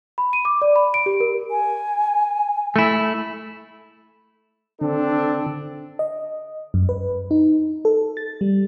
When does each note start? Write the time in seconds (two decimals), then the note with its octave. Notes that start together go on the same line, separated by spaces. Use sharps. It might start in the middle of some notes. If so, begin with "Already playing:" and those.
0.18 B5
0.33 D#7
0.45 D6
0.62 D5
0.76 B5
0.94 D7
1.06 G4
1.20 A#4
1.51 G#5
2.76 A3 E4
4.81 D3 C4 D4 A4
5.99 D#5
6.74 F#2
6.89 B4
7.31 D#4
7.85 A4
8.17 A6
8.41 G3